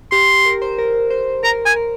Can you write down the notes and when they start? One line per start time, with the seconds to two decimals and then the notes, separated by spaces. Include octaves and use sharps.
0.11 G4 C6
0.46 A#4
0.62 C5
0.79 A#4
1.10 C5
1.43 A#4 A#5
1.66 G#5
1.76 A#4